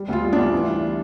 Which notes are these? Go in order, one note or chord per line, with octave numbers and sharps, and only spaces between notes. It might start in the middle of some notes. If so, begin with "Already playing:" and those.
Already playing: G3
D2 F4
G3
D4
D2
E3
G3